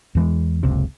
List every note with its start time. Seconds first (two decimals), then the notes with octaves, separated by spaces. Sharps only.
0.15 E2 E3 G#3
0.63 F#1 C#2 C3